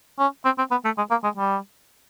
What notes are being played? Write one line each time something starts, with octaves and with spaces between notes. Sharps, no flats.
C#4
C4
C4
B3
A3
G#3
A#3
G#3
G3